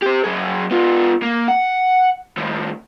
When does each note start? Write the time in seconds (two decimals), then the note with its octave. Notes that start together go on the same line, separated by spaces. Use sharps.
0.03 G4 C5
0.24 F#3 G#4
0.71 B3 F4
1.22 A#3
1.48 F#5
2.38 A2 D#3